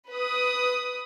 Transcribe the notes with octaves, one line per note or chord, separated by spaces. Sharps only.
B4 D#6